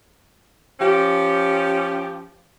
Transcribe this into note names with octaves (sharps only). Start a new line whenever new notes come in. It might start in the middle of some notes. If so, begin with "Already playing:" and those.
F3 C#4 G4